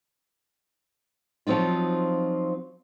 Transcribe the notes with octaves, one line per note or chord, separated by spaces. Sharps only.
F3 F#3 C4 D#4 F4